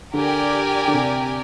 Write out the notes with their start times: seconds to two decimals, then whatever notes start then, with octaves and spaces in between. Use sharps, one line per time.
0.14 D3 G4 A#4 D5 G#5
0.88 D3
0.94 C3